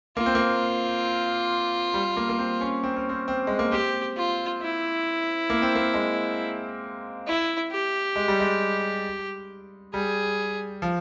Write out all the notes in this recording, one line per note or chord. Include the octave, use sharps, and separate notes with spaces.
A#3 F4
C4
A#3
G3
A#3
A#3
C4
C#4
C4
C#4
C4
C4
G#3
A#3
C4 G4
F4
E4
A#3
C4
A#3
G#3
E4
G4
G#3
G3
G#3
G3 G#4
F3